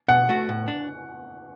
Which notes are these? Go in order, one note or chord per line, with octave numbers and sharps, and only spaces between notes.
B2 F#5
A3 F#4
A2
D4